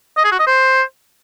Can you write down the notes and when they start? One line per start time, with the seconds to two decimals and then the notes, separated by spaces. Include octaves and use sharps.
0.17 D#5
0.24 G#4
0.32 F#4
0.39 D#5
0.47 C5